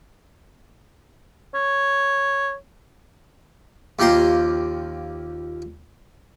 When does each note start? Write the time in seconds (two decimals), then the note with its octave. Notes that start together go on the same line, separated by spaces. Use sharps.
1.55 C#5
3.99 D#2 F3 G4 A#5 C6